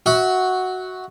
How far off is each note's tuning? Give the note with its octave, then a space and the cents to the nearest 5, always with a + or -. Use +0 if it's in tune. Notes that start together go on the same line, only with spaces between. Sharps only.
F#4 +0 E5 -25